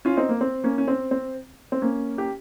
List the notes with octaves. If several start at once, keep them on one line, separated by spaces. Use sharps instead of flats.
C#4 F4
C4 D#4
A#3
C4
A#3 C#4
C#4
C4
C4
C4
A#3 C#4
G4